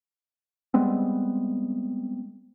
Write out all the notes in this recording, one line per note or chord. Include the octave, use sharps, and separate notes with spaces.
G3 G#3 B3 C4